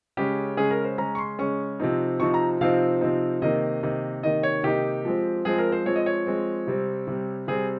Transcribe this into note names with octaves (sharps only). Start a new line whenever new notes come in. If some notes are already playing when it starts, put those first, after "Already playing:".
C#3 G#3 C#4 G4
C#3 G#3 C#4 G#4
A#4
C5
C#3 G#3 C#4 A#5
C#6
C6
C#3 G#3 C#4 C#6
C3 F3 C4 D#4
C3 F3 C4 D#4 C#6
A#5
C3 F3 C4 D#4 F5
C3 F3 C4 D#4
C3 D#3 A#3 D#4 D#5
C3 D#3 A#3 D#4
C3 D#3 A#3 D#4 D#5
C#5
C3 D#3 A#3 D#4 G4
F3 G#3 C4
F3 G#3 C4 G#4
A#4
C5
F3 G#3 C4 C#5
D#5
C#5
F3 G#3 C4
C3 G3 C4
C3 G3 C4
C3 G3 C4 G#4